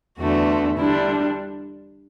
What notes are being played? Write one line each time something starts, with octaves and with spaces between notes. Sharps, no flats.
E2 D3 A3 F#4
D3 G3 D4 E4